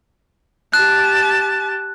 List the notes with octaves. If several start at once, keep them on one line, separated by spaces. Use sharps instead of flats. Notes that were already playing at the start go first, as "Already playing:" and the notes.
G4 A5 F#6